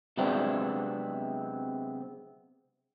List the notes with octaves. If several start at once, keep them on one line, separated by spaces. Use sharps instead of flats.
C3 F#3 G#3 B3 C4 D4